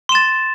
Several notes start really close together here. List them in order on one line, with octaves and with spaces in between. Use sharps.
C6 E7 A6